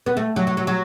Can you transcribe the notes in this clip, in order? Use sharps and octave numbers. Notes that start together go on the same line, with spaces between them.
B3
A3
F#3
F#3
F#3
F#3